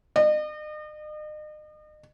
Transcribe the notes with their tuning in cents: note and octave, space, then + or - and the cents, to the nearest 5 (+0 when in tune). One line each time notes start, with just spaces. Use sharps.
D#5 -40